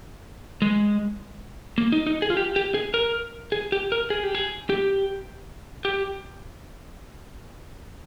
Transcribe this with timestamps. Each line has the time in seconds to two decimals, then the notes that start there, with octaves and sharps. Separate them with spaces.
0.62 G#3
1.78 A#3
1.92 D#4
2.07 D#4
2.22 G#4
2.30 F4
2.37 G4
2.56 G4
2.74 G#4
2.94 A#4
3.52 G#4
3.72 G4
3.92 A#4
4.10 G#4
4.23 G4
4.35 G#4
4.70 G4
5.85 G4